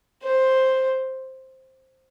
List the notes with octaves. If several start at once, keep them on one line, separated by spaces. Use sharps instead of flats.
C5